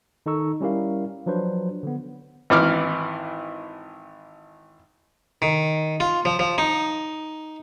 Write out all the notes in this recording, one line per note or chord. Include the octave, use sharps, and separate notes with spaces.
D#3 D#4 A4 A#5 C#6 E6
G3 C#4 E4 G4 A#4 F5
F3 F#3 D4 B4 C5
D3 B3
G#1 E3 D6 F6
D#3
F4
F3
F3
D#4